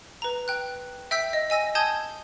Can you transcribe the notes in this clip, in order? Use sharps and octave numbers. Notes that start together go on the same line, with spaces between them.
B4 A#5
G5 F#6
E5 G5 E6 G6 B6
D#5
D#5 G#5 E6 A#6
G#5 A5 D#6 G6 G#6 G7